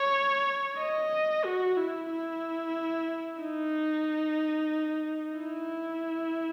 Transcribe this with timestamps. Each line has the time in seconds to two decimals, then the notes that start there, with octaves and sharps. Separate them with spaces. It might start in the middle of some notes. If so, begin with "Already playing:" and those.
Already playing: C#5
0.79 D#5
1.45 F#4
1.77 E4
2.11 E4
3.41 D#4
5.38 E4